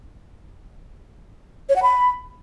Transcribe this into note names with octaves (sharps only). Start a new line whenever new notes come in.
C#5
F#5
B5